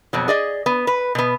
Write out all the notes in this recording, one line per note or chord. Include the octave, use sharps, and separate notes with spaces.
F2 B2 F#3
G#4 D5 D#5
B3
B4
B2 B3